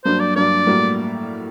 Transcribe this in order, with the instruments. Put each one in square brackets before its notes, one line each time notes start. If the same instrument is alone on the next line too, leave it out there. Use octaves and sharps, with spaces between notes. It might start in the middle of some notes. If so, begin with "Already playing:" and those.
[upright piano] G2 F#3 A#3 D4 [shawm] C5
[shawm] D5
[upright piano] G2 F#3 A#3 D4 [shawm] D5
[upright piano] A2 G3 A#3 F#4